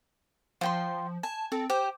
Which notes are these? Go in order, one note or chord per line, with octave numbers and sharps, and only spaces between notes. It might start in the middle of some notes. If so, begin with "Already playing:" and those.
F3 F4 G5 C6
G#5 A5
C4 A4
G4 C5